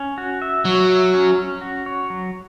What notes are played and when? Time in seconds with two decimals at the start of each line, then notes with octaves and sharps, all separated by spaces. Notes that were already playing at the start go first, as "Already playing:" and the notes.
Already playing: C#4
0.18 F#4
0.42 E5
0.65 F#3 C#5
0.89 E5
1.14 C#4
1.38 C#4
1.61 F#4
1.86 C#5
2.10 F#3